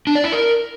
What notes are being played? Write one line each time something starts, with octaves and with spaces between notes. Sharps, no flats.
D4
D5
E4
A#4